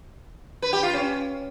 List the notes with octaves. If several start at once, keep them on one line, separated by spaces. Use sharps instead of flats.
B4
G4
F4
C#4